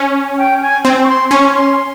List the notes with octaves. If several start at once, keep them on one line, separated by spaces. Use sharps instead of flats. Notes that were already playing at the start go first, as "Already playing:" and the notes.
Already playing: C#4
G5
G#5
C4
C#6
C6
C#4 C#6
C6